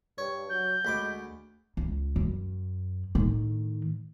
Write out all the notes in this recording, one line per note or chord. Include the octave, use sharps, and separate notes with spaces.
G2 C#5
F#3 G6
D2 G#3 B5 D6
C#2
F#2
A2 D#3